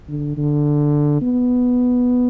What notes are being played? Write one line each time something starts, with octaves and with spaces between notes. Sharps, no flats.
D3
D3
B3